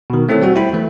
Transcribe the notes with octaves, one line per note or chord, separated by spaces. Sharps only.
B2 D#3
A3 C4 E4 A4 C#5
G3 C4 F#4
E4 C5 G5 B5
E3 A3